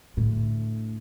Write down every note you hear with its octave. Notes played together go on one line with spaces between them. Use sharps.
A2 D3